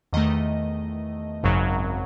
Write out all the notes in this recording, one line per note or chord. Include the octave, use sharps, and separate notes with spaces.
E2 D#3 A3 D#5
G#1 F#2 C#3 F#3